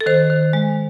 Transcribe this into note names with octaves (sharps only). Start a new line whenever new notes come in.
A4
D#3 C5
D#3
G#3